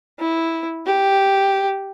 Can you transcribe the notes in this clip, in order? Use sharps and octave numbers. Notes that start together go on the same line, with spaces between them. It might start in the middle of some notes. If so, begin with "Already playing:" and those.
E4
G4